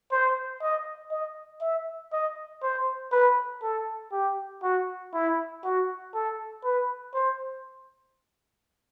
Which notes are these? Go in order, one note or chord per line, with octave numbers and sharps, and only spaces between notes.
C5
D#5
D#5
E5
D#5
C5
B4
A4
G4
F#4
E4
F#4
A4
B4
C5